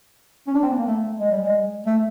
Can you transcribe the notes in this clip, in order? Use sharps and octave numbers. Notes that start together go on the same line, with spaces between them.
C#4
D4
C4
B3
A#3
A3
G#3
G3
G#3
A3